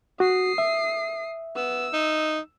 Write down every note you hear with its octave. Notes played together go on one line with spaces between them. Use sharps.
F#4 D#6 C7
E5
B3 E6
D#4